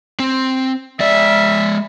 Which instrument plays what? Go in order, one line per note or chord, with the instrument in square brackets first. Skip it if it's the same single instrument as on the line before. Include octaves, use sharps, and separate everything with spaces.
[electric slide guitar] C4
[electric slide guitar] G#3 D5 [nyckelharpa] E5